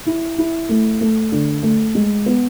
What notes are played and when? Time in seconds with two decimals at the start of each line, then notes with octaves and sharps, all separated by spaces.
0.06 E4
0.38 E4
0.69 A3
1.01 A3
1.32 D3
1.63 A3
1.95 G#3
2.26 B3